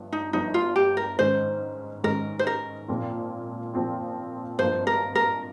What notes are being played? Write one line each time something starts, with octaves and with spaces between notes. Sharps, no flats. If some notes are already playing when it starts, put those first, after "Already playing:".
Already playing: G1 G2 F3
D#4
G1 G2 F3 D#4
F4
G4
A#4
G#2 D#3 G#3 C#4 C5
G#2 D#3 G#3 C#4 A#4
C5
A#4
A#2 F3 C4 F4
A#2 F3 C4 F4
G#1 G2 F3 A#3 C5
A#4
A#4